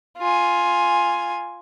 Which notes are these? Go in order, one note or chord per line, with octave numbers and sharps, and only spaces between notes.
F4 G#5